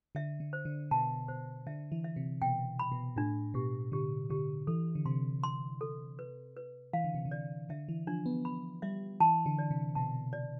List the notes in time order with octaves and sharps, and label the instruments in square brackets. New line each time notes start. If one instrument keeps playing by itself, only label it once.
[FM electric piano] D3 [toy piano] E5
[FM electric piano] D3
[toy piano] C5
[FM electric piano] D3
[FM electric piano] B2 [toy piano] A5
[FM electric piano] B2 [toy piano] C5
[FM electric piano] D3 [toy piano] E5
[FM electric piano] E3
[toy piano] E5
[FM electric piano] C3
[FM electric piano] B2 [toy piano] G5
[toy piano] B5
[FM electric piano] B2
[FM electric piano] A2 [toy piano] D4
[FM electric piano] B2 [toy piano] G4
[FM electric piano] D3 [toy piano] G4
[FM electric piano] D3 [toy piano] G4
[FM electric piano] E3 [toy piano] A4
[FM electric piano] D3
[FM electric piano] C3 [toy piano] C6
[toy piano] C6
A4
B4
B4
[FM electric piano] E3 [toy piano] F5
[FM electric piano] D3
C3
D3
[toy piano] D5
[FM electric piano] D3 [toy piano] E5
[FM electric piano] E3
[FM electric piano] F3 [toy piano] D4
[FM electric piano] B3
[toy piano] B5
[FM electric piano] G3 [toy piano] E5
[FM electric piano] E3 [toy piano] A5
[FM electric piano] D3
[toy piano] D5
[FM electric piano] C3
[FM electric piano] B2 [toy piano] A5
[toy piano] D5